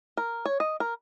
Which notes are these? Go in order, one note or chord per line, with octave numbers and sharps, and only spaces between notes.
A#4
C#5
D#5
A#4